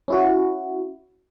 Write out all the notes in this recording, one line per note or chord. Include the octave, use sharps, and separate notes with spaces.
C#4 E4 F#4